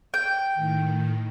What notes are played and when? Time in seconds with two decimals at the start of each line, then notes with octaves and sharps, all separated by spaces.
0.14 G5
0.55 A2 D#3